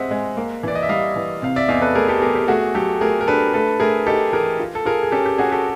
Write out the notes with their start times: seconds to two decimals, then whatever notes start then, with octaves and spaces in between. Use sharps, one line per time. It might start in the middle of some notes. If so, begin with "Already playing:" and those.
Already playing: G#3 C4 D#5 E5 F#5
0.11 G#3
0.37 A#3
0.63 E3 D5
0.75 D#5
0.82 E5
0.89 G3 D#5 F5
1.16 E3
1.42 C3 F5
1.56 D5 E5
1.68 E2 D#5 F5
1.82 A4 B4
1.95 A3 G#4 A#4
2.09 G4 A4
2.22 E2 G#4 A#4
2.35 G4
2.48 A3 F#4 G#4
2.75 F#3 G4 A4
3.01 A3 G#4 A#4
3.21 A#4
3.27 D4 A4 B4
3.53 A3 A4 B4
3.80 A3 G#4 A#4
4.07 D#4 G4 A4
4.33 E3 G#4 A#4
4.59 F4
4.75 A4
4.85 F4 G#4 A#4
5.03 G#4
5.12 C#4 G4 A4
5.26 G4
5.38 C#4 F#4 G#4
5.52 G4 A4